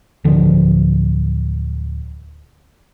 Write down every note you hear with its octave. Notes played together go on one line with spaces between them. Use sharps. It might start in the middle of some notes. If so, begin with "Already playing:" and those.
D1 D3 F3